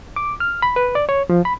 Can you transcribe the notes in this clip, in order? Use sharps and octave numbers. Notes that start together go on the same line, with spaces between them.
D6
F6
B5
B4
D5
C#5
F3
B5